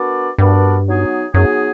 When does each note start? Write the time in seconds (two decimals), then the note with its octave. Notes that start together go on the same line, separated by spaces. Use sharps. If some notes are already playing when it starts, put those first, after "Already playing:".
Already playing: B3 D4 F#4 A#4 D5
0.38 G2 B3 D4 F#4 A#4 D5
0.86 F#3 B3 D#4 G#4
1.34 F#2 F#3 B3 D#4 G#4